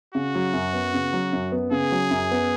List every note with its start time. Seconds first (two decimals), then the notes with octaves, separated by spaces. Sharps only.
0.14 C#3 F#4
0.35 F#3
0.54 F#2
0.73 B3
0.94 C#3
1.13 F#3
1.33 F#2
1.52 B3
1.71 C#3 G#4
1.92 F#3
2.11 F#2
2.31 B3